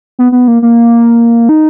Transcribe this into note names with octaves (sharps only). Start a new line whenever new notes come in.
B3
B3
A#3
A#3
D#4